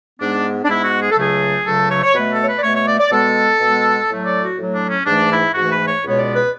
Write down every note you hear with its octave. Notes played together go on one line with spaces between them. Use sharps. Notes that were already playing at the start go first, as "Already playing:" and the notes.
G#2 G#3 B3 D4
D4
G#2 G#3 B3 E4
F#4
G#4
A4
C#2 C#3 F#3 A3 G#4
C#2 C#3 F#3 A3 A4
C#5
C#5
B2 A3 B4
A4
C#5
B4
D5
B2 A3 C#5
C#5
D5
D5
B2 G#3 B3 A4
B2 G#3 B3
A2 F#3 A3
D5
F#4
A2 F#3 A3
D4
C#4
G#2 E3 A3 D4
E4
G#2 E3 A3 F#4
B4
C#5
C#2 B2 G#3 B3 C#5
D5
B4